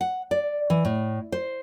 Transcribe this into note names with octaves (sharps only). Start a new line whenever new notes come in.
F#5
D5
E3
A2
C5